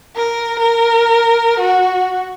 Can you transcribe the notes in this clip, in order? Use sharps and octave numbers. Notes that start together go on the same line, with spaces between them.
A#4
A#4
F#4